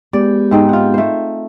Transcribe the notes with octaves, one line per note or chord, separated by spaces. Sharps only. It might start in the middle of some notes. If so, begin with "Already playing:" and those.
G#3 B3 G4 D5
G#2 C4 D#4
F4 F#5
A3 C5